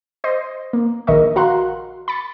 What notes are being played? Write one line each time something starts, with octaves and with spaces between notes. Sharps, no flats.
C5 D#5 C6
A#3
A#1 D#3 A#4 D#5 E5 C#6
F#4 A#4 F5 A#5 C6 F#6
B5 A6 C#7